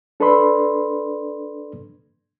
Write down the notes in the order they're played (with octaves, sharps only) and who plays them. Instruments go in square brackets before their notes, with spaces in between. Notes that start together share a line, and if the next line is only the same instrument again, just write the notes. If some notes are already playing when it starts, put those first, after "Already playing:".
[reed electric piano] D4 A4 B4 D5 B5 C6